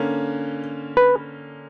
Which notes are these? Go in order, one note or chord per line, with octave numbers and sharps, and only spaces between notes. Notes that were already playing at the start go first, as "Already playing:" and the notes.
Already playing: D3 A#3 C#4
B4